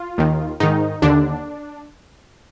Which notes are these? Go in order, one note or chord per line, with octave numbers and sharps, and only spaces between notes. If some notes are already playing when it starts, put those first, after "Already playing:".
Already playing: F4
D#2 D#3
G#2 D#3 D#4
D#2 D3 D4